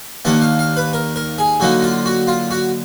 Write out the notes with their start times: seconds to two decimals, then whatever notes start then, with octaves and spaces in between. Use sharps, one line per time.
0.25 D#2 D#3 A#3 D4 F#5
0.42 F5
0.59 F5
0.77 B4
0.94 A#4
1.16 A#4
1.38 G#4
1.60 D3 F#3 A#3 D#4 F#4
1.82 F4
2.06 F#4
2.27 F4
2.51 F#4